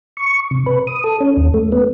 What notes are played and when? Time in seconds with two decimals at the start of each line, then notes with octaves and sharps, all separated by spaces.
0.17 C#6
0.51 C3
0.66 B4
0.87 D#6
1.04 A4
1.20 C#4
1.37 D#2
1.54 A3
1.72 B3